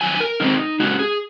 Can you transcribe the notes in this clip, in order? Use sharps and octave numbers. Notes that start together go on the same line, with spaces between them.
F2 D#3 F#3 G#5
A#4
C3 D#3 G#3 C4 D#4
C#3 G#3 C#4 F#4
G#4